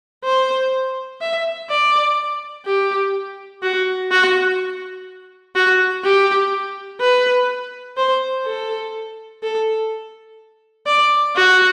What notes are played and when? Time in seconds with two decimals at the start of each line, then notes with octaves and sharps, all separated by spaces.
0.24 C5
1.21 E5
1.70 D5
2.66 G4
3.62 F#4
4.11 F#4
5.55 F#4
6.04 G4
7.00 B4
7.97 C5
8.46 A4
9.43 A4
10.87 D5
11.36 F#4